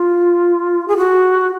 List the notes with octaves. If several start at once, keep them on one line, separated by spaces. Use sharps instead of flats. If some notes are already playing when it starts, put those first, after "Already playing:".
Already playing: F4
G#4
F#4